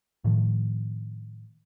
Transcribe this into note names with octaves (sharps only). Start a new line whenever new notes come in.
A2 D#3 F3 A3